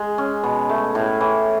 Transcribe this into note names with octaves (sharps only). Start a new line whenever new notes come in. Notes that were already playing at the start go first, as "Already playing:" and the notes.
Already playing: G#3
C#4
B2
A3
A2
E3